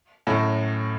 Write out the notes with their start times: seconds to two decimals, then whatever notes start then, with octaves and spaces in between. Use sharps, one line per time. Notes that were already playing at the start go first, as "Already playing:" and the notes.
0.27 F#2 A2